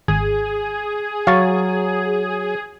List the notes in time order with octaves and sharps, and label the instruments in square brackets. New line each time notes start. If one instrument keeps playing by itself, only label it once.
[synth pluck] G#1 [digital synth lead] G#4
[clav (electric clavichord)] F#3 [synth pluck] F5 C#6 A6